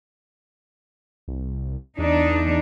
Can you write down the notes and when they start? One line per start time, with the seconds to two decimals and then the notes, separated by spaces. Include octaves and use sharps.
1.28 C2
1.98 E2 D4 D#4